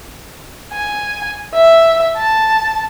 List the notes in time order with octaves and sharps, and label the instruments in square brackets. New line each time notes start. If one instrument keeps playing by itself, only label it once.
[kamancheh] G#5
E5
A5